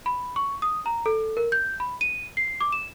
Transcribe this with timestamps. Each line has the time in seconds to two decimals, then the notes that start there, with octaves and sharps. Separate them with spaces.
0.06 B5
0.36 C#6
0.62 D#6
0.86 A#5
1.06 A4
1.37 A#4
1.52 G6
1.80 B5
2.01 D#7
2.37 C7
2.61 D6
2.72 E7